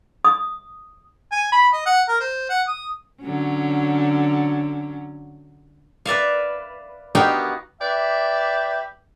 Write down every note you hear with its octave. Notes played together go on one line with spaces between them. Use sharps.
D#6
G#5
B5
D#5
F#5
A#4
C5
F#5
D#6
D3 F#3 C#4
B4 D5 E5 F5
B3 D#4 F#4 G4 F5 G5
G4 B4 D5 E5